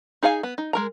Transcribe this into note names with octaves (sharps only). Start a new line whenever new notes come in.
D#4 G#4 D#5 F5 G#5
B3
D#4
G#3 A#4 A#5